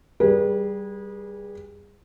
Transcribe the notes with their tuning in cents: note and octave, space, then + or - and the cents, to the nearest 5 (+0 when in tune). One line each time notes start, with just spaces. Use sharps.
G3 +0 G#4 -20 B4 -35